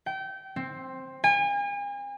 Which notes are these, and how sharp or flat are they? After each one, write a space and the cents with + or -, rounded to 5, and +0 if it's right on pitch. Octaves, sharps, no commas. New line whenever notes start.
G5 -25
C4 +10
G#5 -40